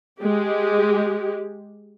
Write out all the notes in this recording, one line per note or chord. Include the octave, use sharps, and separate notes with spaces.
G#3 G4